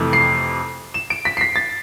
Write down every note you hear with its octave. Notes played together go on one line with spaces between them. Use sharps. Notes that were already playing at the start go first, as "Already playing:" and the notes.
Already playing: F2 C3 E3 A3
C7
E7
D7
B6
C7
B6
A6